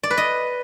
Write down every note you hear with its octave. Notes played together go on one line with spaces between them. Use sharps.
D5
B4
D#5